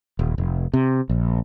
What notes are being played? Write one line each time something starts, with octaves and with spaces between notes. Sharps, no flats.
D#1
F1
C3
A#1